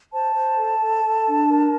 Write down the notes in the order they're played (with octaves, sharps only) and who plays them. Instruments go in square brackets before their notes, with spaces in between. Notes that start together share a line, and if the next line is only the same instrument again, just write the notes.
[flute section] C5 A5
C5
A4
A4
A4
D4
A#4